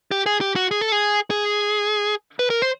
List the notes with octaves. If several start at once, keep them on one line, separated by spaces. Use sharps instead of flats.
G4
G#4
G4
F#4
G#4
A4
G#4
G#4
B4
A#4
C5